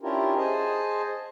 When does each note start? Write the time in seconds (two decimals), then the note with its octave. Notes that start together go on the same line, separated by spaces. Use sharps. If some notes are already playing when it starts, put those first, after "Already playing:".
0.01 C#4 D4 E4 F4 G4 A#4
0.37 G#4 C5 D#5 G#5 A5